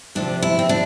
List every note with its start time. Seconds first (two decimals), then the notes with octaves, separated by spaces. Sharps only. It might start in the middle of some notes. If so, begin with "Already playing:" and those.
0.15 D2 C3 F3 D4
0.42 E4
0.59 C4
0.69 D4